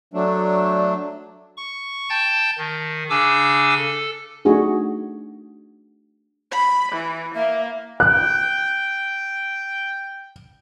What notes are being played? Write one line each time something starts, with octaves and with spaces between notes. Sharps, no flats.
F#3 A3 D4
C#6
G5 A5 G6 A6
D#3
C#3 D4 G#5 D6 E6
A4
A3 D4 D#4 F#4 G#4
B5
E3
A#3 E5
G5 F#6